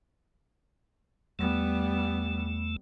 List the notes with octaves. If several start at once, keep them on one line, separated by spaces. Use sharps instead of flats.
E2 G3 A3 B3